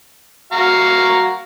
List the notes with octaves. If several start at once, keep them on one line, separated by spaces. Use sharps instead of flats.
F#4 F5 A#5